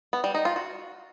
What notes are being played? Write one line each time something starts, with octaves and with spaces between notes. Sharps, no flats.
B3
G3
D#4
F4
F#4